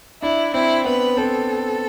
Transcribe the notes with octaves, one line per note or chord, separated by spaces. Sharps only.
D4 E4
C4 E4
B3 B4
C4 A4